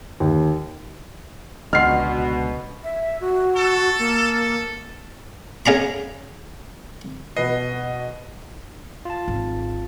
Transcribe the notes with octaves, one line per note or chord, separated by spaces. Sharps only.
D#2
C#2 B2 D3 D#5 F#5 C6 F6 C7
E5
F#4
A4
A#3
A4
C#3 C#4 A#5 B5
B2 B4 D#5 C7
F4 A5
G#1